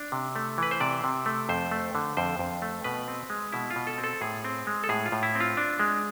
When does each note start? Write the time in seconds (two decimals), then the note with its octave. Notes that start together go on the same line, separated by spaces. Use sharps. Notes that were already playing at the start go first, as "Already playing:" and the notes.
Already playing: D4
0.12 C3
0.36 A3
0.58 E3 B4
0.71 C5
0.80 C3 D5
1.04 C3
1.26 A3
1.49 F2 C5
1.71 A3
1.95 D3
2.17 F2 C5
2.39 F2
2.62 A3
2.84 B2 B4
3.08 C4
3.30 G#3
3.53 B2 E4
3.71 F4
3.76 B2
3.87 A4
3.98 C4
4.04 A4
4.21 A2 G#4
4.45 C4
4.67 G#3
4.84 A4
4.89 A2 G#4
5.06 F4
5.12 A2
5.23 E4
5.35 C4
5.40 F4
5.57 D4
5.80 G#3